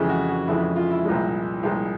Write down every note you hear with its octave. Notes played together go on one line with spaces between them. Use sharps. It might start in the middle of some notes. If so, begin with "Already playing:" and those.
Already playing: F2 C#3 E3 G#3 G#4
F#4
F#4
F2 C#3 E3 G#3 E4
F4
E4
C2 A#2 F3 G#3
C2 A#2 F3 G#3